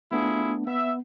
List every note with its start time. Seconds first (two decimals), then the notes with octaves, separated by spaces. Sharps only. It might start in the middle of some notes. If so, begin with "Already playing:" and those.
0.12 A3 B3 D4 E4 F4 G#4
0.67 B3 E5